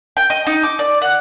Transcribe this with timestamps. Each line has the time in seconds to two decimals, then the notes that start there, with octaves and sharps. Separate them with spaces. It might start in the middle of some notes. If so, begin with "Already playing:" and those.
0.17 G5
0.30 D#5
0.47 D#4
0.63 D6
0.79 D5
1.02 F#5